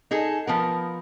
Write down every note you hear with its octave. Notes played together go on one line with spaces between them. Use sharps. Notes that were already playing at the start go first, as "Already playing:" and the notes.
D#4 G#4 A4
F3 B3 A#4